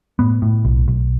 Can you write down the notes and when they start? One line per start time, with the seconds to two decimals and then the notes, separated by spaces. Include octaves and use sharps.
0.19 A2 B3
0.42 A2
0.65 B1
0.88 B1